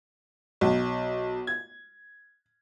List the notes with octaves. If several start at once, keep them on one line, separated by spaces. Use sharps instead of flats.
B1
G#6